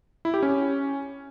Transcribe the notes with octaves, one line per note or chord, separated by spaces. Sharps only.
E4
G4
C#4